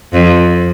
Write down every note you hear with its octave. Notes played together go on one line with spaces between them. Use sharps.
F2